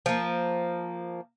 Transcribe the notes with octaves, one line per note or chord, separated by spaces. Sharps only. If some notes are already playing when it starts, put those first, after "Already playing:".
F3 A#3